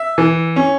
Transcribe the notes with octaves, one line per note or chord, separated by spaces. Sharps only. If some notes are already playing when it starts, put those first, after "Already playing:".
Already playing: E5
E3
C#4